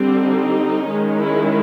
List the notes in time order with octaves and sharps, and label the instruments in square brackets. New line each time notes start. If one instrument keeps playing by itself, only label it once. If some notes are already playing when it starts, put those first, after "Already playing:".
Already playing: [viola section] D3 G3 C4
D#4
D#3 G#3 C#4
E4